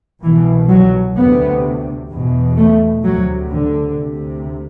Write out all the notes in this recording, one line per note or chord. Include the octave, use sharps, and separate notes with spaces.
C2 B2 E3
F#3
D2 C3 B3
E2 B2
A3
D2 C3 F#3
D3
D2 C3